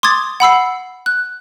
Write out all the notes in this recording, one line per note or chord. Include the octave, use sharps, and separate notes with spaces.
C6 D6 D#6 G#6 A6
F#5 B5 E6 C7
F#6